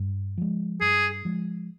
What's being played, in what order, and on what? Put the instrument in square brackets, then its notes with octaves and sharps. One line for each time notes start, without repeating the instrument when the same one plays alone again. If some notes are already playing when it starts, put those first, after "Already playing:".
Already playing: [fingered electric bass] G2
F3 G#3
[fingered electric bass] G2 [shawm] G#4
[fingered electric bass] F3 G#3